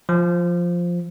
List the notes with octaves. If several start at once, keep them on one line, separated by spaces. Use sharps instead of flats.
F3